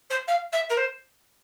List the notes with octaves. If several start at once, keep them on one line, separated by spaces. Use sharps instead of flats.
C5
F5
E5
A#4
C5